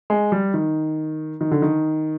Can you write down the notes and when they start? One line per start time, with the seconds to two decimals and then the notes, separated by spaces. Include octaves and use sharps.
0.10 G#3
0.32 G3
0.54 D#3
1.41 D#3
1.51 D3
1.62 D#3